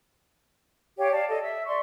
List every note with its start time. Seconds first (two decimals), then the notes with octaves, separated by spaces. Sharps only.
0.98 G4 C#5 F5 G5
1.11 D5 F5 A5
1.28 A4 D5 D#5
1.41 E5 E6
1.66 D5 C6 C#6